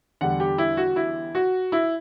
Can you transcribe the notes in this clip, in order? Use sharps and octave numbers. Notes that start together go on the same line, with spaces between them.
E2 D3 G3 F#5
G4
E4
F#4
E4
F#4
E4